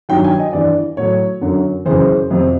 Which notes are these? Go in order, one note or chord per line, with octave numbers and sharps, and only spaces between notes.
G2 D#3 F#3 G5
G#5
D#5
G2 E3 D5
A2 F#3 C#5
F#2 D3 F#3
F#2 C#3 E3 C5
F2 C3 F3